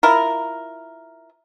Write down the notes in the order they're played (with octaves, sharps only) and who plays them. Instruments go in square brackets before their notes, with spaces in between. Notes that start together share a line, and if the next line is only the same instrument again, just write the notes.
[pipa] E4 F4 A#4